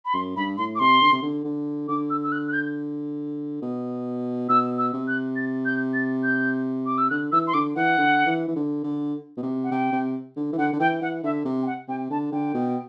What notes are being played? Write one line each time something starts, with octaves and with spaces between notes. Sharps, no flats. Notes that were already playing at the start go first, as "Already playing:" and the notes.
B5
F#2 C6
G2 B5
A2 C6
D6
C3 C6
D3
C3
D3
D3
D3 D6
E6
E6
F#6
F#6
G6
B2
B2 E6
E6
C3
F#6
A6
G6
A6
G6
D6
E6
D3 F#6
E3 E6
C6
D3 D6
E3 F#5
D3
E3
E3
D3
D3
B2
C3
F#5
C3 G5
C3
D3
E3
D3 F#5
D3
E3 G5
E3 F#5
D3 E5
C3
G5
F#5
C3 G5
D3 A5
D3 G5
B2